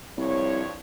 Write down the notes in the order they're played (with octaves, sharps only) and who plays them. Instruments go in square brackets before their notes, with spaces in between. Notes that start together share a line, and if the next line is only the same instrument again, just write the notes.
[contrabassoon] C2 [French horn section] G2 F3 C#5